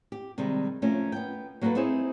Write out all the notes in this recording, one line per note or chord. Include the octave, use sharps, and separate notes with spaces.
G4
C3 D#3 G3 G#3
F3 A3 C#4 A#4
B3 G5
F#3 A#3 F#4 G4 A4 B4
C4 D#4 E4 G#4 C5 C#5